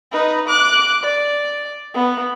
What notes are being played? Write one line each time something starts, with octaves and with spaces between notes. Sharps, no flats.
D#4 B4
D6 F#6
D5
B3